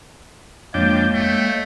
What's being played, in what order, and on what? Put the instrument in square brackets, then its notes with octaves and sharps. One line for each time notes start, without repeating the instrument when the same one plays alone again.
[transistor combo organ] F2 D4 G5 [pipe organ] G#3 A#3 C#5
[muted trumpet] A3 [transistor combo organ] G5